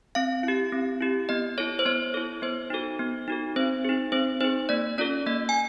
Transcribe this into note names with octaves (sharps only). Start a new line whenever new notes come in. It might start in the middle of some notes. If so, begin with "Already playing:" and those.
C4 F5
E4 G4
C4
E4 G4
B3 D#5
E4 A4 C#5
C5
B3 C#5
E4 A4
B3 C5
D#4 F#4 A4
B3
D#4 F#4 A4
C4 C5
D#4 G#4
C4 C5
D#4 G#4 C5
A#3 D5
C#4 F4 A4 D5
A#3 D#5
G#5